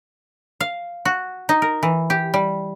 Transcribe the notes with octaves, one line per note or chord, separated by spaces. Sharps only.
F5
F#4
D#4
A#4
E3
G4
G3